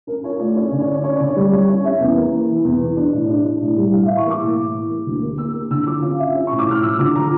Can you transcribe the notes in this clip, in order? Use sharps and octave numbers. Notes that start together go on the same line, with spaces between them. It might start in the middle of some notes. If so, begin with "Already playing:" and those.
C#4 A#4
F4 C#5
A3 D5
C#4 C#5
D3 D5
C#5
C#4 D5
C#4 C#5
D3 D5
C#5
G3
G3 C#5
C#4 C#5
C#4 E5
E2
A#3
E3
E3
E2
E2
D4
A2
D4
D4
A2
G3
A2 F5
E3 E5
C#6
A#3 D6
A2
A2
E3
A#3
D2
A#3
A#3 E6
A#3
D3 E6
F3 D6
C#4 F5
F4 E5
C#4
A2 C#6
D6
A2 F6
F3 E6
D3 D6
F3 A#5